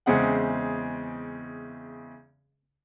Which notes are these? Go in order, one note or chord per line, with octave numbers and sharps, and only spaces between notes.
E2 C#3 G#3 C4 G#4 F#5